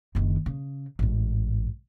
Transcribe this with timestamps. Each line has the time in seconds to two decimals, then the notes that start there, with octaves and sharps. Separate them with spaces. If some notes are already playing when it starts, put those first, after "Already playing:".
0.15 F#1 D#3
0.46 C#3
0.99 A1 G#2